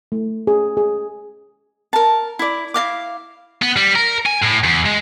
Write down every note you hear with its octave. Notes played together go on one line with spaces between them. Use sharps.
A3
G#4
G#4
A#4 A5
E4 D5
E4 D#5 F5 D6
B3
G3
A#4
G#5
A2
E2
G#3